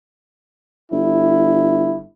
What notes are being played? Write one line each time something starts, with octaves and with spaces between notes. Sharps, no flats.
G1 E4